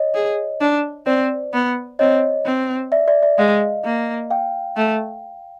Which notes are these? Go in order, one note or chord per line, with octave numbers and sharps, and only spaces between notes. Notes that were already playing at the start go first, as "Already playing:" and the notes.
Already playing: C#5 D#5
G#4
D4
C4 C5 D5
B3
C4 C#5 D#5
C4
D5 E5
D5 E5
D5 E5
G#3 D#5 F5
A#3
F5 G5
A3